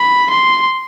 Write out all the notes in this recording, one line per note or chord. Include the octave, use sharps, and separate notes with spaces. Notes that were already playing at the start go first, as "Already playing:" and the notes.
Already playing: B5
C6